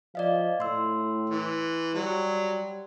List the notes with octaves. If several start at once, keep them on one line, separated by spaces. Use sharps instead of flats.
F3 D5 D#5 F5
A2 C6 E6
E3
F#3 G3